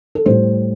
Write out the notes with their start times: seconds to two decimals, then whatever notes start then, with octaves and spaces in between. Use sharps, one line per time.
0.15 A4
0.26 A2 G3 C5